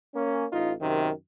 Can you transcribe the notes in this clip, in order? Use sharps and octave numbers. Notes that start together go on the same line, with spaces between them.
A#3 C#4
A1 D#4 F4
F#2 C3 D#3